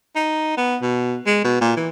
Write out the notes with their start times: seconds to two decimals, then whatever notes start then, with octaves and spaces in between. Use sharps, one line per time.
0.15 D#4
0.58 B3
0.82 B2
1.26 G#3
1.44 B2
1.61 A#2
1.77 E3